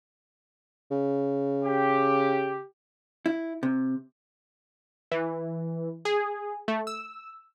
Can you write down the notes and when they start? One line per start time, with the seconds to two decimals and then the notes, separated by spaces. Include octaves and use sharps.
0.91 C#3
1.64 G4
3.26 E4
3.63 C3
5.11 E3
6.05 G#4
6.68 A3
6.87 E6